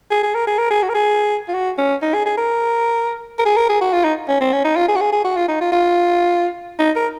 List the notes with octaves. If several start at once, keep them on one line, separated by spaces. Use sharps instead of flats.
G#4
G#4
A#4
G#4
A#4
G#4
F#4
A#4
G#4
F4
F#4
C#4
D#4
G#4
G#4
A#4
A#4
G#4
A#4
G#4
F#4
F4
D#4
C#4
C4
C#4
D#4
F4
G#4
F#4
G#4
G#4
F#4
F4
D#4
F4
F4
D#4
A#4